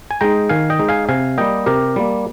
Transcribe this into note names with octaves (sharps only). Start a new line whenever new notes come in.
G#5
G#3 D#4 G5 A#5
D#3 F5 G#5
D#5 G5
G#3 D#4
F5 G#5
C3 F5 G#5
G3 A#3 D#5 G5
C3 G4 A#4
G3 A#3